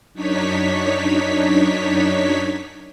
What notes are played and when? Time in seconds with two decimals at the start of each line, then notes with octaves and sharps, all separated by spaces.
0.14 F#2 D4 D#4 C#5 B6